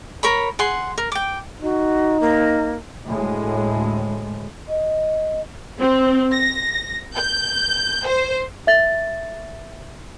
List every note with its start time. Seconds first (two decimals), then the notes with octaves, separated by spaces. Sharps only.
0.23 A#4 C#5 B5
0.59 G#4 F#5 C6
0.98 A#4
1.12 G5 D6
1.62 D#4 F#4
2.21 A#3
3.06 D2 A2 G#3
4.68 D#5
5.79 C4
6.33 A#6
7.16 G6
8.06 C5
8.67 E5 A6